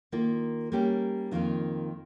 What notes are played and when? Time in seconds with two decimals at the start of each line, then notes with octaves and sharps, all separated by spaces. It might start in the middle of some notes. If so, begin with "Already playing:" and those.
0.12 D#3 A#3 F4
0.72 G3 A#3 C#4 G4 A#4
1.31 F2 D#3 A#3 F4